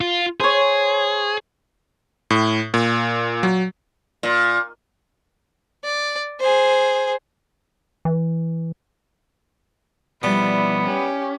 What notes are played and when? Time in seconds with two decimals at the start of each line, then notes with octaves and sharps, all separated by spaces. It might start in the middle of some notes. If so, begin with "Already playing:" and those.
0.01 F4
0.40 G#4 C5 C#5
2.30 A2
2.74 A#2
3.43 F#3
4.23 A#2
5.84 D5
6.40 G#4 C5
8.05 E3
10.23 B2 F3 G3 B3 E4 D5
10.85 C#4 G4